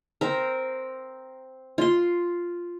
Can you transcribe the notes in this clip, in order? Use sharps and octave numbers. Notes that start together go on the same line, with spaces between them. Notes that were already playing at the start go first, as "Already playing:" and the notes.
C4 A#4
F4 C6